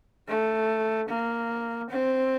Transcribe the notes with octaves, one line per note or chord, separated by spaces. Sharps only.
A3
A#3
C4